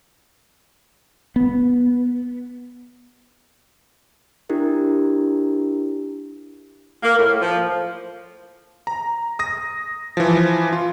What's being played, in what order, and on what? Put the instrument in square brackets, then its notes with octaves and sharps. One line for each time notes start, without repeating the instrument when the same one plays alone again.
[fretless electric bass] B3
[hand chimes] D4 E4 G4 A#4
[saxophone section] A#3
A2
F3
[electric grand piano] A#5
D#6 A#6
E3 F3
F4